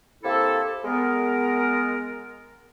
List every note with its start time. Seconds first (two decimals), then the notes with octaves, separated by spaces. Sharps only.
0.24 C3 A#3 E4 A4
0.84 G#3 B3 A#4